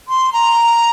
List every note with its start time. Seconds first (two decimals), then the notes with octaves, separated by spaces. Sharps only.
0.08 C6
0.33 A#5